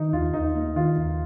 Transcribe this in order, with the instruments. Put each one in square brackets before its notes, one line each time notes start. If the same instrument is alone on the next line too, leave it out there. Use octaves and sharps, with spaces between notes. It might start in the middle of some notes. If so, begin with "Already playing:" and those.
Already playing: [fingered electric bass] D#3 [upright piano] D#4
[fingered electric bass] D#2 [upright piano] F4
[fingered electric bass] D#2 [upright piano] D#4
[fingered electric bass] A#3
[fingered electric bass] D#3 [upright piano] F4
[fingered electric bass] D#2